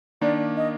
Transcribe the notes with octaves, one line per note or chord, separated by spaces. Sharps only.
D#3 A#3 D4 D5
D#5